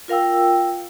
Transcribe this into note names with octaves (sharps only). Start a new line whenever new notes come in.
F4 A#4 F5 G5 E6